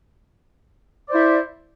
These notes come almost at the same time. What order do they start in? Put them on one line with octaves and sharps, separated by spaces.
D5 C5 E4